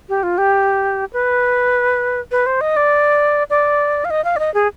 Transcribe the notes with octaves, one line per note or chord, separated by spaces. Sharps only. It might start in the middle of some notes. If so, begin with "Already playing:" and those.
G4
F4
G4
B4
B4
C5
D#5
D5
D5
F5
D#5
F5
D5
D#5
G#4